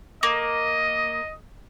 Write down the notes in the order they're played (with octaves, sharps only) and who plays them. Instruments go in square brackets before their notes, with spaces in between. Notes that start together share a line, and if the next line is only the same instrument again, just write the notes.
[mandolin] A#3 [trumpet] D#5